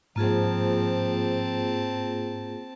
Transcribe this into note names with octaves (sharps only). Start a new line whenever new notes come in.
G#2 F3 A#3 C4 F4 G#4 A5